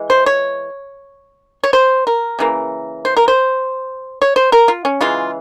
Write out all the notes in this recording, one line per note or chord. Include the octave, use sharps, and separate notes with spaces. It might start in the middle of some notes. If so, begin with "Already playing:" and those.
Already playing: E3 G#3
C5
C#5
C#5
C5
A#4
C#3 E3 A#3
C5
A#4
C5
C#5
C5
A#4
F4
C#4
C#3 E3 G#3 F4